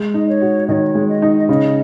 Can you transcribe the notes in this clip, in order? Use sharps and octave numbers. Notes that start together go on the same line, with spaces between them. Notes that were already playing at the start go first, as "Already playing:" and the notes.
Already playing: G#3
D#4 D#5
C#5
F#4
D#3 C#5 D#5
G#3
D#5
D#4
C#3 D#5